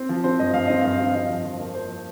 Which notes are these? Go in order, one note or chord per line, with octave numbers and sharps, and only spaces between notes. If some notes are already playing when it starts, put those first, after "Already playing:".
Already playing: C4
F3
C4 C5
G2 D#5
G2 F5
C4 D#5
G2 F5
C4
F5
F3 D#5
F2
F3
A#3
A#3 C5